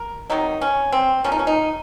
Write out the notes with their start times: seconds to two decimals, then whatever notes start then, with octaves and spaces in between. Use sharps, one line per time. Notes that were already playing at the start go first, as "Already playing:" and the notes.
Already playing: A#4
0.30 C3 D#3 F#3 D#4
0.61 C#4
0.92 C4
1.24 C#3 F3 A#3 C#4
1.32 D#4
1.39 C#4
1.47 D#4